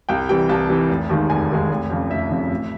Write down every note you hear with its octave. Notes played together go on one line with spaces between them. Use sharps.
C2 G5
C3 E3 G3 G5
C2 A5
C3 E3 G3
F1
D#2 D#3 G#3
F1 G#5
D#2 D#3 G#3
F1
F2 C#3
F1 E5
F2 C#3
A1